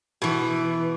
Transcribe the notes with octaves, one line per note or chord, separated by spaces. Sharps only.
B2 E3